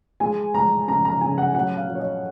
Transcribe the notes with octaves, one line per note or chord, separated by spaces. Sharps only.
G#3 G#5
G#3 A#5
C#3 A#5
A#5
C#3 G#5
F#5
F#3 F#5
F5
F#3
C#5
D#5